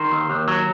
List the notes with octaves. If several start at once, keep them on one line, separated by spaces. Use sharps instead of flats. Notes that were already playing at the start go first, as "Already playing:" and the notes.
Already playing: D#3 C5
D#2
D#2
F#3